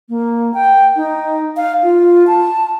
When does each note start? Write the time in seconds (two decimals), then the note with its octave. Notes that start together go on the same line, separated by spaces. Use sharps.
0.09 A#3
0.54 G5
0.96 D#4
1.57 F5
1.83 F4
2.27 A5